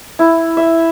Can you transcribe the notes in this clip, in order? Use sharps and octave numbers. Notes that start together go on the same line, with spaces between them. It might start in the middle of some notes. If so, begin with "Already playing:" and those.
E4
E5